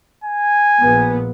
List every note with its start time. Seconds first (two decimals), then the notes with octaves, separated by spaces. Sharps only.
0.24 G#5
0.81 A#1 B3